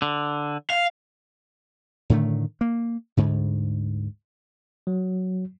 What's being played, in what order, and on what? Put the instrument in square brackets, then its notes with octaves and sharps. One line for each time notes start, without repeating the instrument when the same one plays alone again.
[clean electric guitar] D3
[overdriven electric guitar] F5
[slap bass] A2 D3 D#3 A3
A#3
D2 G#2 D3
[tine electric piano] F#3